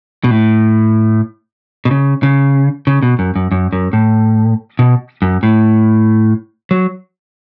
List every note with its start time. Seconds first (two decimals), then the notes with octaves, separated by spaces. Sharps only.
0.24 B2
0.31 A2
1.85 B2
1.91 C#3
2.23 C#3
2.87 C#3
3.03 B2
3.19 F#2
3.36 F#2
3.52 F#2
3.73 F#2
3.93 A2
4.79 B2
5.22 F#2
5.43 A2
6.71 F#3